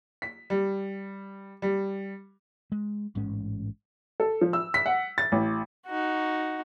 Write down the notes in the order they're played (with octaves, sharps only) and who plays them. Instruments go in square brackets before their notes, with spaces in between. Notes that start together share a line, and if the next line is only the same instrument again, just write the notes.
[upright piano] B6
G3
G3
[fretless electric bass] G#3
A1 G#2 G#3 C#4
[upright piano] A4
F3
E6
B6
F#5
A6
A1
[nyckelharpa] D#4 F#4